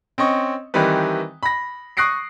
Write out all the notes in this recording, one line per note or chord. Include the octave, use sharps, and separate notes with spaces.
C4 C#4 D#5 C#6
D#3 E3 G3 C4 D#4 B4
B5 A#6
C#6 D#6 F#6 A#6 C7 D7